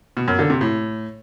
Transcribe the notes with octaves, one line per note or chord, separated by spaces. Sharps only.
B2
F#2
D3
C3
A2